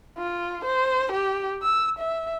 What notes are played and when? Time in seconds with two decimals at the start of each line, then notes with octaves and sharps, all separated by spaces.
0.18 F4
0.65 C5
1.12 G4
1.62 E6
1.99 E5